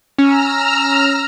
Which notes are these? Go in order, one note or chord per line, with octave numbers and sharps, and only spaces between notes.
C#4 A#5 E6 F6